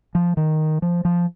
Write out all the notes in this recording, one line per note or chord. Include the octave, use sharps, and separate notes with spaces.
F3
D#3
F3
F3